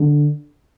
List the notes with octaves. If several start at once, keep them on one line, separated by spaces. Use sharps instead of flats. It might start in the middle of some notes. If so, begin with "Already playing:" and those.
Already playing: D3